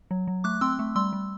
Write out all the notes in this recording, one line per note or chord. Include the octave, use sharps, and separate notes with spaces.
F#3
F#3
A3 D6 F#6
C4 C6 E6
A3
G3 C6 E6
G3